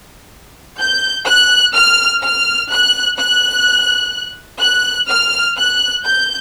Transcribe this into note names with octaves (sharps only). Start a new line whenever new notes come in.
G6
F#6
F6
F6
F#6
F#6
F#6
F6
F#6
G6